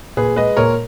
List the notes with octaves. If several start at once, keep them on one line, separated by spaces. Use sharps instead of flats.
A#2 G#4 B4
G#3 B4 D#5
A#2 A#4 C#5